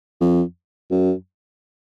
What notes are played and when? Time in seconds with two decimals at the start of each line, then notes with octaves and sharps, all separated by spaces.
0.21 F2
0.91 F#2